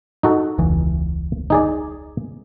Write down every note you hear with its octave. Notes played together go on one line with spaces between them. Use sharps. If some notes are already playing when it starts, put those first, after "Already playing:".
D#4 F#4 A4
E1 C#2 E3
D#4 G#4 D5